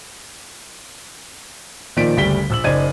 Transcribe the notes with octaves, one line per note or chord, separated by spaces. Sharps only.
A#2 D#3 F3 D5 B6 D7
F#1 D2 G3 B6 G7
A#1 E6 F#7
F#1 D#4 C5 D5 G#6 D#7